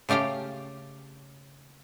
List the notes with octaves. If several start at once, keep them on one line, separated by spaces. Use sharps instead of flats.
C#3 A3 G4 F5 G5